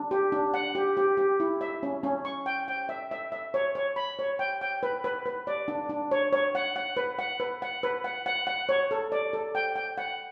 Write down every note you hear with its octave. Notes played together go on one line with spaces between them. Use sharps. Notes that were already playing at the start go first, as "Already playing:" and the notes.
Already playing: D4
G4
D4
F#5
G4
G4
G4
E4
E5
C#4
C#4
C#6
G5
G5
E5
E5
E5
C#5
C#5
B5
C#5
G5
G5
B4
B4
B4
D5
D4
D4
C#5
C#5
F#5
F#5
B4
F#5
B4
F#5
B4
F#5
F#5
F#5
C#5
A4
D5
A4
G5
G5
F#5